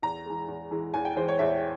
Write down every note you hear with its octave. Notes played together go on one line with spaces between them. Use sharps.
E2 A#5
E3 G#3
E2
E3 G#3
E2 G#5
G5
E3 G#3 C5
C#5
E2 E5